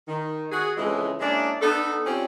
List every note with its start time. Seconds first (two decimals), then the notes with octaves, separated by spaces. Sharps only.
0.08 D#3
0.51 F#4 G#4
0.77 F2 C#3 E3 G#3
1.19 G#3 A#3 C#4 D4 E4 G#4
1.61 B3 D4 D#4 A4
2.05 F2 C4 C#4 G4 D5